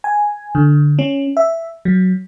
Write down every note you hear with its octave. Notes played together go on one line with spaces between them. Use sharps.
G#5
D3
C#4
E5
F#3